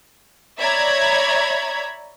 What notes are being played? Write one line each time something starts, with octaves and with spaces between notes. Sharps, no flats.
C#5 D5 E5 A#5 B5 G#6